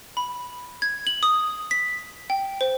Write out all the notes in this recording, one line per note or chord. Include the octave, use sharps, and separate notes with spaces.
B5
G#6
F#7
D#6
B6
G5
C5